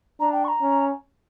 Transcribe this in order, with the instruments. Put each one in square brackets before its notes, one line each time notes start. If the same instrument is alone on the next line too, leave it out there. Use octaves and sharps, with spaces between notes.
[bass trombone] D4 [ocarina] A#5
[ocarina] G5
C#6
A#5
[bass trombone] C#4